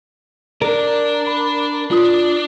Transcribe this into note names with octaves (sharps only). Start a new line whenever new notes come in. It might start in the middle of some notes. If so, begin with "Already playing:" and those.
D4 A#4 D5
B5
D4 F4 D#6